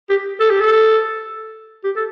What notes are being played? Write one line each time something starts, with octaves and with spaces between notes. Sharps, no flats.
G4
A4
G4
A4
G4
A4